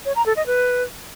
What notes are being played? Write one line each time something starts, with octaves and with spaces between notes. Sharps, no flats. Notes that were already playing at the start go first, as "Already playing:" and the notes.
C#5
A#5
A4
D#5
B4